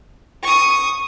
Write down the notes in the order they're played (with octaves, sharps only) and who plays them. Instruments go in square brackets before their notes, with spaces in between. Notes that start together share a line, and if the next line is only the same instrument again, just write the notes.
[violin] C#6 D#6